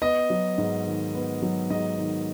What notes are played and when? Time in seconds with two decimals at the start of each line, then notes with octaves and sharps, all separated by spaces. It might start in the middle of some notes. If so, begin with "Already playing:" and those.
0.02 B3 D#5
0.30 F#3
0.58 G#2
0.87 D#3
1.14 B3
1.42 F#3
1.70 G#2 D#5
1.99 D#3